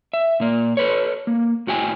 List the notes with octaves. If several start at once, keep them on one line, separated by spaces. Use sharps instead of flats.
E5
A#2 A#3
A4 B4 C#5
A#3
A2 F#4 G5 G#5